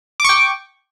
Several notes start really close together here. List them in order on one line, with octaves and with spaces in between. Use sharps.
D6 C#6 G5